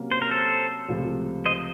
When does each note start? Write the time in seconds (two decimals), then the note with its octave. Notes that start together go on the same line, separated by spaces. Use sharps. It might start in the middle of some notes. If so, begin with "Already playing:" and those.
Already playing: C3 F#3 A#3 C#4
0.12 C5
0.22 A#4
0.31 A4 C5
0.88 C#2 C3 F3 A3
1.46 C5 D#5